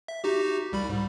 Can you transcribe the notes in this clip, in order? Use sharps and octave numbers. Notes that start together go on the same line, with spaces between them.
E5
D#4 F#4 G4
C2 G3 B5
G#2